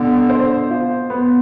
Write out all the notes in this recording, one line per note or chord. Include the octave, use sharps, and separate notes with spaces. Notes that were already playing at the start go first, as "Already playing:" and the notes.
Already playing: B2 D3
C5
F4
B3